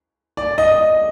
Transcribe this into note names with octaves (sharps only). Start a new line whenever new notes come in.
D5
D#5